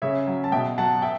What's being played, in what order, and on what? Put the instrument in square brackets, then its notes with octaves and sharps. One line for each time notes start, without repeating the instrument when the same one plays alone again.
[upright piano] C#3 C#5 E5
F#3
A5
B2 E5 G5
F#3 F#5 A5
E5 G5